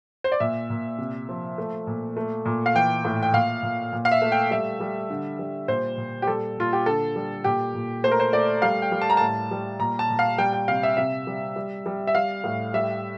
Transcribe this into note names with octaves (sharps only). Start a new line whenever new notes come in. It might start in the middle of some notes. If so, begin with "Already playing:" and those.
C5
D5
A#2 E5
A#2
C3
F3
A3
A#2
A3
A#2
F5
E3 G5
A2
G5
A#2 F5
A#2
A#2
F5
E5
A3
G5
G3 E5
G3
D3
G3
A#2 C5
A#2
G4
G3 A4
A#2 F4
G4
D3 A4
G3
A#2 G4
A#2
A3 C5
A#4
C5
A3 D5
G3 F5
G5
G3
A5
A#5
A2 A5
G3
A#2 A#5
A5
A#2
F5
G3 G5
G5
C3 F5
E5
C3 E5
G3
G3
G3
E5
G3 F5
A2
G3 E5